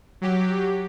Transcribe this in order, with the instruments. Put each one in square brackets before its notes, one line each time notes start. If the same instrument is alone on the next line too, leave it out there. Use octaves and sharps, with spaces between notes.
[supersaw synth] F#3 G4